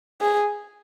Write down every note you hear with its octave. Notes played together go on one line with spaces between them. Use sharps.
G#4